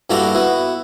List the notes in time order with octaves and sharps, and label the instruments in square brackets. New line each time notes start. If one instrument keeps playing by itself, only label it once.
[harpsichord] G2 A#3 E4 F#4 A4 A#5
B3 E4 F#4